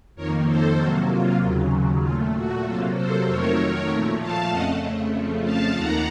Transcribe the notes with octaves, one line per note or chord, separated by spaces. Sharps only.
F2 D#3 A#3 A#4 C#5
A4 C5
C3 F#3 A#3 F#4
F4
D#2 C#3 F#3
A#2 A3 F4
F#4
C3 F#3 A#3 F4 A4
A4 C5
F2 D#3 F#3 A3 A#4 C#5
A#2 F3 A3
F5 A5
F2 C#3 A3 D#5 F#5
F2 C#3 F3 A3
F5 A5
D#2 D#3 A#3 F#5 A#5